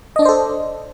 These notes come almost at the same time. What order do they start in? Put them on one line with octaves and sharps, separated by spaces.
D#5 D4 D5 C5 A4